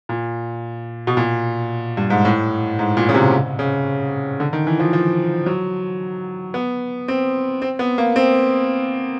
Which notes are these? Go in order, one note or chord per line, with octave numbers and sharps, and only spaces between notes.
A#2
B2
A#2
G2
G#2
A2
G#2
A#2
C#3
C3
C#3
D3
D#3
E3
F3
F3
F#3
B3
C4
C4
B3
A#3
C4